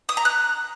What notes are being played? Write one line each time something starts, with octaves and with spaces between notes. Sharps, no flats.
D#6
A#5
F#6